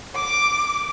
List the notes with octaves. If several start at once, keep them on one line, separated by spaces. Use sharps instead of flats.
D6